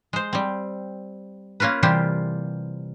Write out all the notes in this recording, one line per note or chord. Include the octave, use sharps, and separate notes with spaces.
G#3 C5
G3 C4
A#3 C#4 F4 A#4 B4
C3 E3 G3 F4 G4 C5